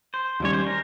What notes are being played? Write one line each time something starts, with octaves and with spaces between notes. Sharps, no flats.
C5
D#2 D#3 G3 C#4 C#5
C5
A#4